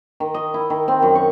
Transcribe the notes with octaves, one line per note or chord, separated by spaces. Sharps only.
D#3
D#5
E4
D#3
C4
F#2
C#6